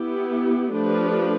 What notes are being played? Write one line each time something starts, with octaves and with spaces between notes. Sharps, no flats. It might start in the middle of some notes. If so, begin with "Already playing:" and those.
Already playing: B3 E4 G4
F3 A3 D4 G4 B4